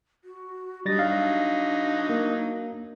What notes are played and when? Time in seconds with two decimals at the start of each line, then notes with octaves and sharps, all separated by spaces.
0.24 F#4
0.86 F#3 G3 D4 D#4 A6 A#6
0.99 F5
2.09 A#3